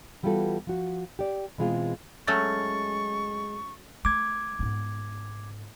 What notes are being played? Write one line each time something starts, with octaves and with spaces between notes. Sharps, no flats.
E3 G3 B3 F4 F#4 A4
F3 F#4
G4 D5
B2 E3 G#3 C4 F4 G#4
F#3 G#3 A3 C#4 C#6 A6
A3 D6 G#6
G#2 B3